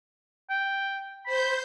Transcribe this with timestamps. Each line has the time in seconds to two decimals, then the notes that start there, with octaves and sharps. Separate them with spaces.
0.50 G5
1.26 C5 B5 G6